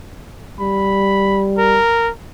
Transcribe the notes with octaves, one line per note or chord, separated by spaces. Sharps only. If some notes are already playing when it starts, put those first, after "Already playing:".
G3 B5
A#4